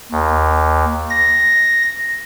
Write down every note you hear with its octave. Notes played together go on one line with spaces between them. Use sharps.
D#2
A#6